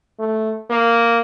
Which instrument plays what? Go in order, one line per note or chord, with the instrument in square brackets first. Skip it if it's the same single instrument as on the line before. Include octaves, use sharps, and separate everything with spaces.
[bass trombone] A3
A#3